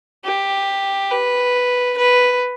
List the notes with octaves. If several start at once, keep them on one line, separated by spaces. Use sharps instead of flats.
G4
B4
B4